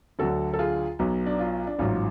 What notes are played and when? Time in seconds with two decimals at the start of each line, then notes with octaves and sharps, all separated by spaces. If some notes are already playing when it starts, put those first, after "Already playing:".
0.19 D2 D3 F#3 F#4 A4
0.53 A4
0.59 F4 G#4
0.99 B1 B2 F#3
1.26 D4
1.39 F4
1.67 D4
1.79 A1 G#2 F#3 F4